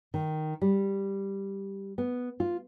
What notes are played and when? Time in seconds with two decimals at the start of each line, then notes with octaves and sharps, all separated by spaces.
0.14 D#3
0.61 G3
1.98 B3
2.40 F4